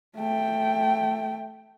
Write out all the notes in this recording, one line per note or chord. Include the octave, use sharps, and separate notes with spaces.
A3 G5